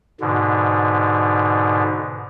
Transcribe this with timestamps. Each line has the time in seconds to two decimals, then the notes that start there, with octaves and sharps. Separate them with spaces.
0.20 G#2 B2 D3